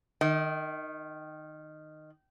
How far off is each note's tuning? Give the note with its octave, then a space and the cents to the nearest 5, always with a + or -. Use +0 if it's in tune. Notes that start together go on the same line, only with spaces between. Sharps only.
D#3 -15 D#5 +40